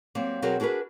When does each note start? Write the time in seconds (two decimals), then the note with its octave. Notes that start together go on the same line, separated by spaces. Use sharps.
0.15 F#3 G3 A#3 C4
0.42 B2 F#3 C4 F#4 G#4 A#4
0.60 D4 F#4 G#4 A#4 B4